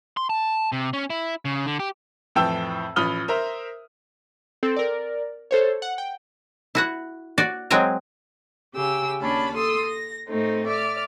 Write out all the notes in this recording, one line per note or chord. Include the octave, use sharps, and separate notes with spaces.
C6
A5
C3
C#4
E4
C#3
D3
G4
F2 A2 E3 G5 A5 E6
A1 F3 B5 D#6 F6 G7
A#4 C5 E5 A#5
C4 A4
A#4 D5
A4 C5 C#5
F#5
G5
E4 F#4 F#5
F#4 D5
F#3 G#3 C4 G5 G#5 A#5
C#3 G4 G#4 E6
D#2 C#4 D4 A5 B5
A4 C6 D#6 E6
A#6
A2 A3 C4 D#4
D5 E5 F6